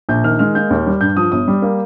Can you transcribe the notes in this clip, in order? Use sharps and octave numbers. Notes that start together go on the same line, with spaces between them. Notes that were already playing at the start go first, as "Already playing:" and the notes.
A#1 G6
D#3 F6
G#3 F6
A#3 G6
D#2
G3
G2 G6
F3 D#6
G1 D#6
G3
A#3